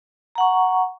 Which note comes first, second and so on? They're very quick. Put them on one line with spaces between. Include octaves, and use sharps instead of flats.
A#5 F#5 C#6